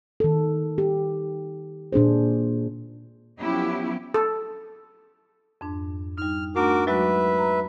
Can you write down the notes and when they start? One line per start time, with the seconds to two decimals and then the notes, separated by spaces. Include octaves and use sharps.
0.20 D#3 A4
0.78 G4
1.93 A#2 D4 G#4 C5
3.41 F3 F#3 B3 C#4 E4 G4
4.14 A4
5.61 F2 G#2 D4
6.18 G3 D#4 F6
6.56 A3 D4 F#4 A#4 D6
6.87 F#3 G#3 F#4 B4 E5
7.38 A#5